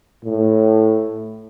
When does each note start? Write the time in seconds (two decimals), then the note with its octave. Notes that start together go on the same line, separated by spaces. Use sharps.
0.25 A2